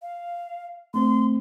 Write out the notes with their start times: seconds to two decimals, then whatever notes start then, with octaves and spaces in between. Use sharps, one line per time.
0.02 F5
0.94 A3 C4 C5 C6